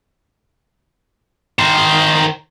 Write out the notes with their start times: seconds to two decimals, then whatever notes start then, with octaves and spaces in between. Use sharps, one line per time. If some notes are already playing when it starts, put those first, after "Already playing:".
1.59 D#3 C5